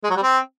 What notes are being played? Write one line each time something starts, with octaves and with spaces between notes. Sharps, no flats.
G#3
F#3
G3
C4